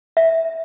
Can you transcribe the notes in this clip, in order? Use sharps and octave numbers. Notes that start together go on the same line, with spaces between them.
E5